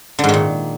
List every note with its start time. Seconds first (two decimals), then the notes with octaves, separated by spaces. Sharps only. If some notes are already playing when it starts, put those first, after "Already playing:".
0.19 D3
0.24 G#2
0.29 D#3
0.34 A#2